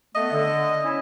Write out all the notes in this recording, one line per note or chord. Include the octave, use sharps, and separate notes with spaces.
A3 B3 D#5
D3
C#4 E4